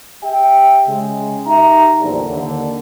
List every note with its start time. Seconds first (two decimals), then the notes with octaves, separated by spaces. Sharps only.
0.23 G4 E5 G5
0.88 C#3 G#3
1.47 D#4 G4 E5 A#5
2.00 A#1 E2 D3 G3
2.30 D#2 D3